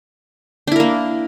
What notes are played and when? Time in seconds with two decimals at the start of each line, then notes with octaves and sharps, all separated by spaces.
0.67 D4
0.72 E4
0.76 A#4
0.80 A#3